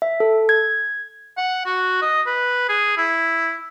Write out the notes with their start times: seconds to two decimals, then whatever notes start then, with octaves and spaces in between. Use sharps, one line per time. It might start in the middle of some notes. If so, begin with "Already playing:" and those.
0.02 E5
0.20 A4
0.49 G#6
1.38 F#5
1.65 F#4
2.02 D#5
2.27 B4
2.69 G#4
2.97 E4